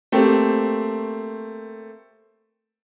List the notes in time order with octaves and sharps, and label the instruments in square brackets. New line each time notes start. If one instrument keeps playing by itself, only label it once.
[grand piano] A3 A#3 C4 G4